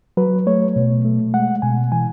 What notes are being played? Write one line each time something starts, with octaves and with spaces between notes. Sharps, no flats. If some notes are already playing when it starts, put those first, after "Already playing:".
F#3 B4
A3 C#5
B2
A3
G#3 F#5
B2 G#5
E3 G#5